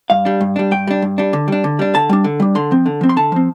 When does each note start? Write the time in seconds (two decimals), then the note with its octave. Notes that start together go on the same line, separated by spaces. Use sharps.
0.10 G2 F5
0.25 G3 D4
0.41 G2
0.56 G3 D4
0.71 G2 G5
0.87 G3 D4
1.02 G2
1.18 G3 D4
1.33 D3
1.48 G3 D4
1.64 D3
1.79 G3 D4
1.94 D3 A5
2.09 G3 D4
2.24 D3
2.40 G3 D4
2.55 D3 C6
2.71 F3 C4
2.86 D3
3.01 F3 C4
3.09 C6
3.16 D3 A5
3.32 F3 C4